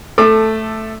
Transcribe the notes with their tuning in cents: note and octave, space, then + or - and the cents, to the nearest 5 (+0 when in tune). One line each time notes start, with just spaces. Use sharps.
A3 +0 A4 +5 D6 +30